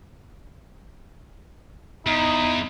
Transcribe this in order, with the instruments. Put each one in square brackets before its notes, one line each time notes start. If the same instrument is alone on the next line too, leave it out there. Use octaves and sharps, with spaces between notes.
[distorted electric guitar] E2 [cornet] D#4